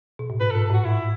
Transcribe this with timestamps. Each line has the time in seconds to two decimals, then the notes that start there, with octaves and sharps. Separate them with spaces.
0.19 B2
0.30 A2
0.40 G#2 B4
0.51 G#2 A4
0.66 G#2
0.70 A2 F#4
0.85 E4